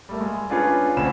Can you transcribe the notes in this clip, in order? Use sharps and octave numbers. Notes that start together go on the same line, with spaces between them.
G3 A3 A#3
G#3
C#4 D4 F4 G#4 B4 C#5
D2 C#3 C4 C#4 B5 E7